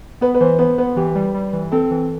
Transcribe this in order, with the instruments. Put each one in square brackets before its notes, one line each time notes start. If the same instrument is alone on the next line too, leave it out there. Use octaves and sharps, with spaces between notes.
[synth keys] B3 [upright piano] B4
[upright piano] B4
[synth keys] E3 [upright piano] C5
[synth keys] B3 [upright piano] B4
[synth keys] B3 [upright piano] B4
[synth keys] E3 [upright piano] G4
[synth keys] G3
G3
E3
[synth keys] C4 [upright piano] A4
[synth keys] E3